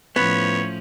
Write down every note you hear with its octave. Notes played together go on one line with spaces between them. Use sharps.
A2 F3 B3 C#4 C#5